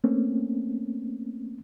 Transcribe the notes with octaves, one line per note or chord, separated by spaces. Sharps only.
A3 A#3 C4 C#4